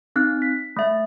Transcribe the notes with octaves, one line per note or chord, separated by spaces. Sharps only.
C4 D#4 F#6
B6
A3 E5